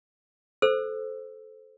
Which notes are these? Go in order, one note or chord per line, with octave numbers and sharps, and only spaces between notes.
A4 C5 E6